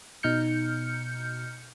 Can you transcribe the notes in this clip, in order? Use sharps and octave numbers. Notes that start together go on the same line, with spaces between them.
B2 D#4 F6 G6 C#7